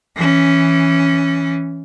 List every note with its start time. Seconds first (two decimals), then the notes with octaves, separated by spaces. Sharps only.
0.16 E3 C#4